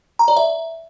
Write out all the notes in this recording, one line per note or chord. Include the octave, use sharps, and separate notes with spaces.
A#5
D5
E5